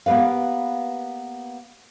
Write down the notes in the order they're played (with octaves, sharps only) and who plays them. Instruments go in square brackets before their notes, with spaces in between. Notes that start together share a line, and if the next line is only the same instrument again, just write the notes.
[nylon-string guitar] A#3 B3 G4 B4 F5